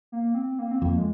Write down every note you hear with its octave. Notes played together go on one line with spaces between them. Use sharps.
A#3
C4
A#3
C4
F2 A#3
G#3